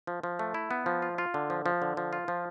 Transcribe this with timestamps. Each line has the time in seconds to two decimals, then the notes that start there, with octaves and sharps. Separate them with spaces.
0.07 F3
0.23 F3
0.39 A3
0.54 E4
0.71 B3
0.86 F3
1.02 F4
1.18 F4
1.34 D3
1.50 F3
1.66 F3
1.82 D3
1.97 F3
2.13 F4
2.28 F3